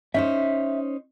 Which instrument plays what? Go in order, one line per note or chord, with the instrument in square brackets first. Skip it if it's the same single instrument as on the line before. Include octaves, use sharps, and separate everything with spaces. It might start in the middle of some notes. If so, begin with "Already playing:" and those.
[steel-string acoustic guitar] C#4 D#4 C5 [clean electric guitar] E5